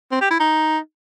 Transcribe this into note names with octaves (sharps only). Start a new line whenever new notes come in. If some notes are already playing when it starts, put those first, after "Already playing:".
C4
G4
E4
D#4